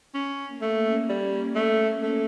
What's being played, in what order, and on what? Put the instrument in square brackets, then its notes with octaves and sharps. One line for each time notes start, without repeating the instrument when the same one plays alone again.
[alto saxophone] C#4
[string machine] A#3
[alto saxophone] A3
[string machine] C#4
[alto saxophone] G3 [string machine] A#3
[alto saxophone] A3
A3